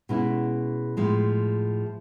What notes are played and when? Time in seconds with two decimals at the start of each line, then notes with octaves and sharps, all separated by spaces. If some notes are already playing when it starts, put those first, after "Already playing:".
0.09 B2 G#3 C#4 E4
0.97 A2 F3 G#3